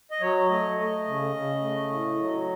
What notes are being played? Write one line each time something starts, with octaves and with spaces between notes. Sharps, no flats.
D#5
F#3 C#5
A3 D#5
A3 D#5
C#3
C#3
A3
A2
F#3